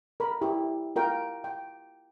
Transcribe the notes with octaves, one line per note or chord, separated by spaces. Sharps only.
A#4 B5
E4 G4
F4 A#4 G5
G5